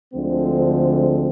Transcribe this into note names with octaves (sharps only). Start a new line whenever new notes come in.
D2 D3 F3 G#3 C4